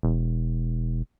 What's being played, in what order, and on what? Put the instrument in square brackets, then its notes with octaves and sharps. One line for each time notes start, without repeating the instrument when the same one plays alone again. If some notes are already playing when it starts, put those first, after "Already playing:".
[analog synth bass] E1